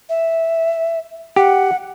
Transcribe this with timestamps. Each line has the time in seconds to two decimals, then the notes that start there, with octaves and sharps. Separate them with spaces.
0.09 E5
1.36 G4 F#5